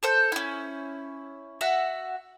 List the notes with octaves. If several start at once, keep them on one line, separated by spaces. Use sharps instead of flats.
A4 C5 G6
C#4 E4
F#4 E5 F#5